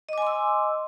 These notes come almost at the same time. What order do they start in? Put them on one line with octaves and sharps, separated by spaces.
D#5 D6 G#5 C6 E6